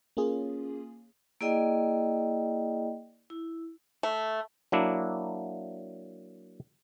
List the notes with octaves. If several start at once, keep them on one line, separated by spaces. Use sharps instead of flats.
A#3 C#4 F4 G#4
A#3 E4 G#4 D5 D#5 G5
E4
A3
F#3 A#3 D4 E4